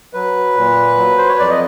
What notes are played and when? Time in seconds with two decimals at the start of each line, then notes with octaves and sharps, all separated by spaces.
0.14 F#3 B4
0.57 A#2
0.97 F#3
1.17 C5
1.29 C#5
1.39 F2 D5
1.49 D#5